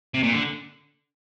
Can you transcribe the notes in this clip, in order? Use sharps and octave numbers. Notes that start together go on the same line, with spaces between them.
C3
A#2
D3